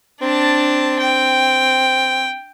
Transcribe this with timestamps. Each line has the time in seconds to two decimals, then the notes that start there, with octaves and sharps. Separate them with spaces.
0.22 C4 D4 A5
1.00 G5